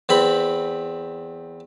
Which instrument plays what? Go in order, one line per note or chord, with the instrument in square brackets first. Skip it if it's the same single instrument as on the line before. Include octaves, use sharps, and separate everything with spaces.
[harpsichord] E2 C4 B5